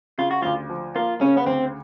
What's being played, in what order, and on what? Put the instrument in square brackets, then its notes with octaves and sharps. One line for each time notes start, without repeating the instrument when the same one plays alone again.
[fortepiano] C#3 [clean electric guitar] F4
[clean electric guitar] F#4
[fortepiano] D2 [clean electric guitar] F4
[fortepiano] F3
[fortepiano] A#3 [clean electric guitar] F4
[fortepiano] C#3 [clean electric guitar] C#4
[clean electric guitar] B3
[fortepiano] D2 [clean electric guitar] C4